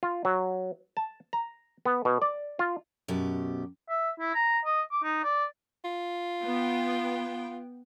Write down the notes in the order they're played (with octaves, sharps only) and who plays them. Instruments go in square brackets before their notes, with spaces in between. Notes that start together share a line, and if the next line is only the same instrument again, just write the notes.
[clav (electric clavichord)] F4
F#3
A5
A#5
B3
B2
D5
F4
[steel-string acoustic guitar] F#2 B2 G4
[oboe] E5
E4
A#5
D#5
D6
D#4
D5
[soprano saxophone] F4
[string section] B3 G5